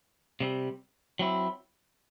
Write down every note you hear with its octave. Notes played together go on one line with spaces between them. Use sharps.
C3 G3 C4
F#3 C4 E4